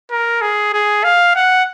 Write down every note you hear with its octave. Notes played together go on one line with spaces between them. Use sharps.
A#4
G#4
G#4
F5
F#5